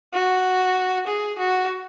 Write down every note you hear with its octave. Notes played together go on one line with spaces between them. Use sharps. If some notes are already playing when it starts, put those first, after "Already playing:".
F#4
G#4
F#4